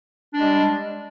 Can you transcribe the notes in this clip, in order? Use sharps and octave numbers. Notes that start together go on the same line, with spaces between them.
G3 G#3 D4